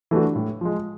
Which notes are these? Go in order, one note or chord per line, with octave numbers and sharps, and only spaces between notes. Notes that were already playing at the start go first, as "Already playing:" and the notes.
E3 A3 D4 F#4
A2
F3 G#3